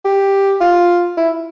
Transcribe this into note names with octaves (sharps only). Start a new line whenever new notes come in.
G4
F4
E4